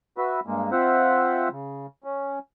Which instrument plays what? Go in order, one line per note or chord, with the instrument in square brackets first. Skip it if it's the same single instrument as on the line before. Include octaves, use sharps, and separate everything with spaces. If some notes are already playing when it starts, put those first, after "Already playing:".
[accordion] F#4 B4 E5
G2 G#3 A#3
C4 F4 C5 E5 F#5
C#3
C#4